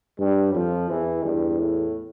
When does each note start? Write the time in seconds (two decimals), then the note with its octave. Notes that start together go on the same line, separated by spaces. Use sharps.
0.19 G2 G3
0.55 F2 F3
0.90 E2 E3
1.24 E2 G2
1.59 A2